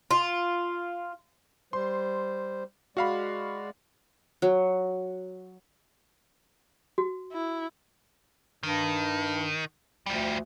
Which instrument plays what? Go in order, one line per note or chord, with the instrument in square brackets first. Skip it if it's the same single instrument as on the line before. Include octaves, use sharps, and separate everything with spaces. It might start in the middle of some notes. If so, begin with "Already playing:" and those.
[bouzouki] F4
[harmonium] G3 C5 [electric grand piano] C6
[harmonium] G#3 D5 [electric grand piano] F#4 F5 B5
[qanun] F#3
[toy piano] F#4
[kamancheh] E4
[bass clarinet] G2 [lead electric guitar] D#3
[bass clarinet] D2 [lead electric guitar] F3 G3